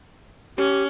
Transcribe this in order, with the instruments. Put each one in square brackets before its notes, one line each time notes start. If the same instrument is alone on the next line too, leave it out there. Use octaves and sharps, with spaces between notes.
[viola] C#4 [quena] G4